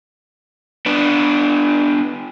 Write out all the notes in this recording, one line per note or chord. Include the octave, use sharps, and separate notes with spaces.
B3 D4